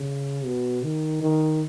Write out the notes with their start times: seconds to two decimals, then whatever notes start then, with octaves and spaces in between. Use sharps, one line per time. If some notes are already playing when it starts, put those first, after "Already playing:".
Already playing: C#3
0.45 B2
0.83 D#3
1.22 D#3